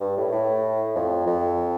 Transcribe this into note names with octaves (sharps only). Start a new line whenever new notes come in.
G2
A2
A2
F2
F2